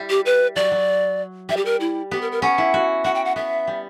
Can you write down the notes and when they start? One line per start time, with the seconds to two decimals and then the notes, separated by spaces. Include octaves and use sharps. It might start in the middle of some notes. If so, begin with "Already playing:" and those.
Already playing: G3 E4
0.10 G4
0.25 B4
0.56 F#3 D5
0.72 F#3
1.49 G3 E5
1.57 G4
1.65 A#4
1.80 E4
2.11 B3 G4
2.22 A#4
2.32 A#4
2.42 C#4 F#5
2.58 E4
2.74 F#4
3.04 F#4 F#5
3.15 G5
3.25 F#5
3.36 B3 E5
3.67 G3